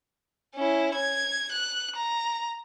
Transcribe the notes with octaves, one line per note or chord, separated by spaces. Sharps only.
C#4 E4
G#6
F#6
A#5